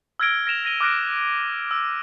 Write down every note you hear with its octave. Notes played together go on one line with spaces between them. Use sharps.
E6 F6 G#6 A#6 D7 G7
F6 A#6 D7 E7 F7
A#6 D#7 G7
D6 F6 F#6 A#6 D7
E6